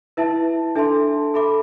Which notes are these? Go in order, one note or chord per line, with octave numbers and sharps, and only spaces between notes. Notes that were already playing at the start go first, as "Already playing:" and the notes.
E4 B4 E5 A5
D4 A4 E5 A5 C6
A4 E5 B5 D6